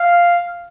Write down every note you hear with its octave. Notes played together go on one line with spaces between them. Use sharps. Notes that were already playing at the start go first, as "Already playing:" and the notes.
Already playing: F5